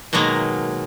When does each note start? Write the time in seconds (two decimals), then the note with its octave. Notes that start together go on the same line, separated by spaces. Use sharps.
0.13 B2 D#3 F#3 G#3 A#3